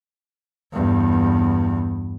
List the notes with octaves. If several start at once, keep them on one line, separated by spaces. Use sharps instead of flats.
E2 G2